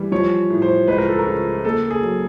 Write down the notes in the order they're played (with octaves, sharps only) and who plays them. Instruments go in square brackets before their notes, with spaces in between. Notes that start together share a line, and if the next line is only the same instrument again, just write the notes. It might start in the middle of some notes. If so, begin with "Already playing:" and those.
Already playing: [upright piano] E3 G3
[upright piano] F3 [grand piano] C#5
[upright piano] A2
[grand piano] C5
[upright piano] C#2 [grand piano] B4
[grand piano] A#4
A4
A#4
[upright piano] C#3
[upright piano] A#3 [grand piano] A4
[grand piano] G#4
[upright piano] F#3